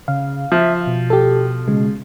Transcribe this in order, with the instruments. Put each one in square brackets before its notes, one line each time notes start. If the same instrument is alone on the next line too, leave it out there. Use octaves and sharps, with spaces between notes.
[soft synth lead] C#3 [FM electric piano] F5
[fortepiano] F3 [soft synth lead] E5
[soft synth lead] B2
[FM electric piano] G4 A4
C#3 G#3